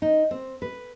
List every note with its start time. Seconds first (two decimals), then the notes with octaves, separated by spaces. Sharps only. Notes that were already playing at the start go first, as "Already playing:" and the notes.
0.02 D#4
0.31 C4
0.62 B4